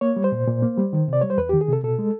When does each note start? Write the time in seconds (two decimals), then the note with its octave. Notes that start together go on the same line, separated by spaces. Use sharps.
0.01 A#3 C#5
0.16 G3
0.24 C5
0.32 A#2
0.47 A#2
0.62 A#3
0.77 G3
0.93 D#3
1.08 C3 D5
1.21 G3 C#5
1.30 C5
1.38 E2 B4
1.49 D#3 G4
1.61 G#4
1.69 C3 A4
1.83 B2 A4
1.99 G#3